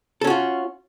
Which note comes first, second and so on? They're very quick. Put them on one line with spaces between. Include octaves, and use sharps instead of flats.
A4 C#4 F#4 F4